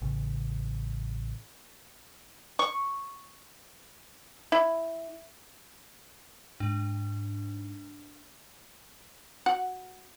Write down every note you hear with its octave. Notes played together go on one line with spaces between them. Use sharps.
A1 C#3
C#6
E4
G#2 D4
F#4 F#5